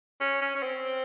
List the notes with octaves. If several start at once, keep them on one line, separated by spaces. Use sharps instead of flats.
C#4
C#4
C#4
C4